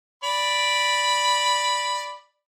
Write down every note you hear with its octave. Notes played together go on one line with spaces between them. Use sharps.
D5 B5